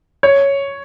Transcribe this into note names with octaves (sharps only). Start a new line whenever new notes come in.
C#5